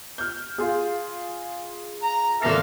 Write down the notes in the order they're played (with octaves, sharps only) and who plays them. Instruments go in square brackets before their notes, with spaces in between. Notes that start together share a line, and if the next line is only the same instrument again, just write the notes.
[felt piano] F6 G6
F4 G#4
[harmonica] A#5
[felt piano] G#1 A#3 A#6 [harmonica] A4 E5 F5